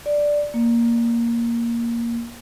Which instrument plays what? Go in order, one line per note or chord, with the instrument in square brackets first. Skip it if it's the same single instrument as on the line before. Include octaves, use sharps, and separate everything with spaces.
[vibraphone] D5
A#3